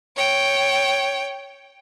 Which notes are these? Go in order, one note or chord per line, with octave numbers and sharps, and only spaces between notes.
C#5 G5